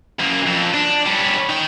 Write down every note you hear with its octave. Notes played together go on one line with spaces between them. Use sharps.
F#2 A#3
F2
D4
G3 C#4
D#4 G5